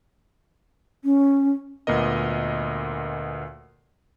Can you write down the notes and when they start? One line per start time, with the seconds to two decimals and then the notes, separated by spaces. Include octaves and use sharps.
1.05 C#4
1.87 D2 A#2 B3 A#4 D#5